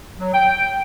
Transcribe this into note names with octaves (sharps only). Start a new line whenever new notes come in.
F#3
G5